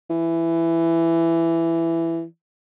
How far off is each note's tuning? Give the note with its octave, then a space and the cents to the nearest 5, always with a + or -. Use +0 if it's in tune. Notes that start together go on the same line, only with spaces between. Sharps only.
E3 +10